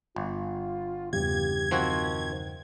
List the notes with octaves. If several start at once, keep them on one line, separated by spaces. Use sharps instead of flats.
G1 F4
E2 G2 C#3 G4 G#6
D#3 F3 C4 F#4